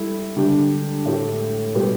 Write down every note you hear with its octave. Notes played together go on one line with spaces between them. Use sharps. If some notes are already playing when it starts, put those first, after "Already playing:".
Already playing: G3 E4 A4
D3 G3 D4 G4
A2 A3 G4
B2 G3 B3 G4